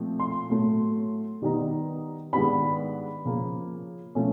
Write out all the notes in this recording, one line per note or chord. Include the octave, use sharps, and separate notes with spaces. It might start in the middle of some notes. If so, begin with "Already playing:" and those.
Already playing: A#2 F3 A3 C4
C6
A2 F#3 A3
D#3 G3 B3 D#4
G#2 D#3 G3 B3 D4 B5
C#3 F3 A#3
F3 A3 C#4